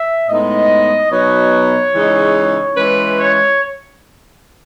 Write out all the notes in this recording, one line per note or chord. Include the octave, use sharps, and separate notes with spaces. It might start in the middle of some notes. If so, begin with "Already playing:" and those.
Already playing: E5
A2 G#3 B3 D#4 D#5
B2 F#3 B3 D#4 C#5
C#3 E3 G#3 D#4
E3 G#3 C#4 B4
C#5